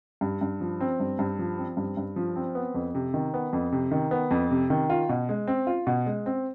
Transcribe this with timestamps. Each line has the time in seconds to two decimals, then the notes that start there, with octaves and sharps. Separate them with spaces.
0.21 G2
0.41 G2
0.61 F3
0.81 C4
1.00 G2
1.19 G2
1.39 F3
1.58 C4
1.77 G2
1.97 G2
2.16 F3
2.36 C4
2.55 B3
2.74 F2
2.95 C3
3.14 D#3
3.34 B3
3.53 F2
3.72 C3
3.91 D#3
4.11 B3
4.31 F2
4.51 C3
4.70 D#3
4.90 F4
5.09 B2
5.29 G#3
5.47 C4
5.67 F4
5.87 B2
6.06 G#3
6.26 C4